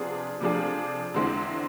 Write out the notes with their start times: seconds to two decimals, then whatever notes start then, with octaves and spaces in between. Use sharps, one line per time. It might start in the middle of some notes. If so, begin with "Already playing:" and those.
Already playing: C3 F3 B3 D4 G#4
0.41 C3 F3 A3 D4 G#4
1.14 E2 D3 G#3 C4 E4